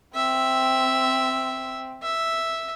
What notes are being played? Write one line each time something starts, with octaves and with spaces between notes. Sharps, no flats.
C4 E5
E5